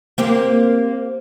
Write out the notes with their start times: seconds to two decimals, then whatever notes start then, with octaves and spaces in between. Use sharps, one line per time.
0.18 A#3 C4 G4